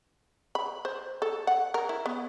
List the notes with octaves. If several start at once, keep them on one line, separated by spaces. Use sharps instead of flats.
B5
C5
A4
F#5
A#4
E4
B3